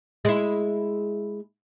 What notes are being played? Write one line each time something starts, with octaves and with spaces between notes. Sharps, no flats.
G#3 E4